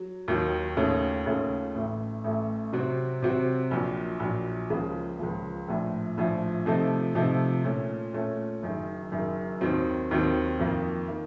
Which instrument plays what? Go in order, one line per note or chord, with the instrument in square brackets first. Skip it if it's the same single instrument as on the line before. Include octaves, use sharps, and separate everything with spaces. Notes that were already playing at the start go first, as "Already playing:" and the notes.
Already playing: [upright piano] F#3
D#2 D#3 F#3
D#2 C#3 A3 C#4 F4
D#2 C#3 A3 C#4 F4
A1 A2 A3
A1 A2 A3
C3 F#3 C4 F#4
C3 F#3 C4 F#4
A#1 A#2 F#3
A#1 A#2 F#3
C#2 C#3 F3 A#3
C#2 C#3 F3 A#3
A#1 A2 F3
A#1 A2 F3
C3 F3 A3 D#4 A4
C3 F3 A3 D#4 A4
A#2 A3 C#4
A#2 A3 C#4
F#1 F#2 D#3
F#1 F#2 D#3
D#2 D#3 F#3 C4
D#2 D#3 F#3 C4
F2 D#3 A#3
D#3 A#3